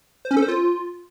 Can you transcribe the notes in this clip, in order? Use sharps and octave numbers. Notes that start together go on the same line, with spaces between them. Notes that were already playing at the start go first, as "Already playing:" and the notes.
C5
C#4
A4
C5
F4